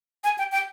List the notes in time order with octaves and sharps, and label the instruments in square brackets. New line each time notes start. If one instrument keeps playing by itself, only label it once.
[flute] G#5
G5
G5